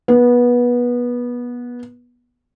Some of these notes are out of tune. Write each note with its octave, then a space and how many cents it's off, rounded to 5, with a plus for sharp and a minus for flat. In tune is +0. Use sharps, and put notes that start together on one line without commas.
B3 -20